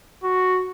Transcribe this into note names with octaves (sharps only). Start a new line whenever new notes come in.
F#4